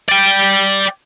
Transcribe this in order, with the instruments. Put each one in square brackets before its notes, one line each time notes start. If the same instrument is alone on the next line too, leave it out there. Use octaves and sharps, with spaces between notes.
[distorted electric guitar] D5 G5